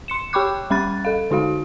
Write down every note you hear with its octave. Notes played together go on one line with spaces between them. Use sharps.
C6 C#7 E7
G4 G5 B5 C#6 D6 F#6
G3 C#4 B5 F#6 A6
A4 F5
D3 D#4 F#4 F5